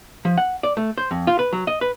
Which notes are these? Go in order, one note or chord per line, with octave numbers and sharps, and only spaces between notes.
F3
F#5
D5
A3
C5
F2
F4
B4
F#3
D#5
B4